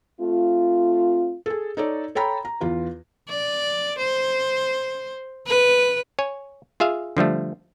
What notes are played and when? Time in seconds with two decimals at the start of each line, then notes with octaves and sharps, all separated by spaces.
0.21 A3 C4 F4
1.46 G#4 A4
1.77 D#4 A4 C#5 D5
2.15 A4 C#5 G5 A#5 B5
2.45 A#5
2.61 E2 F4 B4
3.29 D5
3.98 C5
5.47 B4
6.19 C#5 G#5
6.80 F4 G#4 E5 F5
7.17 D3 F3 G3 A3